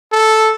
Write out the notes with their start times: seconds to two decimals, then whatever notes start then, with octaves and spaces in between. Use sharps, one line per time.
0.12 A4